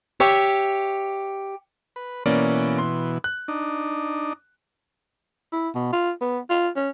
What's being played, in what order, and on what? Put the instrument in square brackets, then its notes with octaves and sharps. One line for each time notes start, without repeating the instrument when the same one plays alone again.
[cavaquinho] G4 C#5 E5
[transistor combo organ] B4
[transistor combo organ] B2 E3 [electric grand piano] A#3 C#4 D5
[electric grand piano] C6
F#6
[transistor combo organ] D4 D#4
[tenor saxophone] E4
B2
F4
B3
F4
C#4